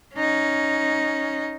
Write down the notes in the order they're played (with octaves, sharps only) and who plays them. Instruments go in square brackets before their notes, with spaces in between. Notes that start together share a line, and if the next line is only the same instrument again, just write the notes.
[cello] C#4 D#4